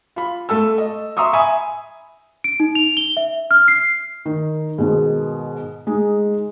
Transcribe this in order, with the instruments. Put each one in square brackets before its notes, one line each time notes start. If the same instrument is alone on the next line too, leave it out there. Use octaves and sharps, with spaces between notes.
[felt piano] F4 B5
A3 A4 A5 E6
D#5
E5 A#5 C6 C#6 D#6 E6
E5 G#5 B5 D#6
[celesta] D7
D#4
F7
G7
E5
F6
C7
[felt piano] D#3
G#2 B2 D#3
G#3 D#4